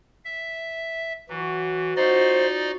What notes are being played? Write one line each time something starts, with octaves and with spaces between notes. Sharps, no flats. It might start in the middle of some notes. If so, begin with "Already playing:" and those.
E5
E3 F#3 C#5
D#4 F4 F#4 C5 D5 D#5